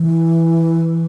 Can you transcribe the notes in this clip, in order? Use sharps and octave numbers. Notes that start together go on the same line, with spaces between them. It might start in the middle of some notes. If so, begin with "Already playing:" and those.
Already playing: E3